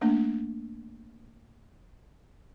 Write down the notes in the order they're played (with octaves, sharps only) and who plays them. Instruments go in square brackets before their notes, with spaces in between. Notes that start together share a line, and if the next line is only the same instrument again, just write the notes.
[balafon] A3 A#3 D4